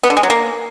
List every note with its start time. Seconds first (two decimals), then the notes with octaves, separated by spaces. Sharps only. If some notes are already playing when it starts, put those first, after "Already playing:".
0.03 B3
0.10 D3
0.17 G#3
0.23 F#3
0.30 A#3